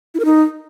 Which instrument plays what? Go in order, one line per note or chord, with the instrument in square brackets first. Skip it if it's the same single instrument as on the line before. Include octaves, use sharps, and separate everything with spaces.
[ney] E4
A#4
D#4